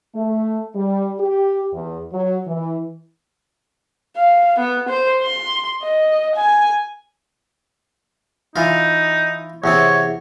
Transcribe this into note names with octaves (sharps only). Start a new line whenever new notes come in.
A3
G3
G4
E2
F#3
E3
F5
B3
C5
C6
D#5
G#5
E3 D#4 F4
E2 C3 C4 C#5